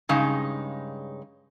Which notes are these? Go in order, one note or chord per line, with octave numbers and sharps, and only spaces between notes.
G2 C#3 G#3 D#4